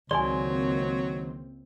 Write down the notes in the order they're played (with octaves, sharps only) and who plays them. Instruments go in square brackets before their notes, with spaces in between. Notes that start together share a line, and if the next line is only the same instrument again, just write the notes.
[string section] C#2 A#3 C4 [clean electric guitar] D#3 C6 [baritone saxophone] F#3 [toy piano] D5 G#5